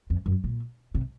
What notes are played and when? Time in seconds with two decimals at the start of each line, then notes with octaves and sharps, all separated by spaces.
0.10 F2
0.26 F#2
0.44 A#2
0.95 C3